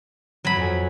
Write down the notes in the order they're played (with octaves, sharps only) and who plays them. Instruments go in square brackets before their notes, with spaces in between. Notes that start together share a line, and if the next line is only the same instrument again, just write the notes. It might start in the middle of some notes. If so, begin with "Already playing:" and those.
[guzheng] F#3 B5
[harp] F2 G#5